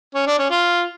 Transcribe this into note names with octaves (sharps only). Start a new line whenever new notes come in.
C#4
D4
C#4
F4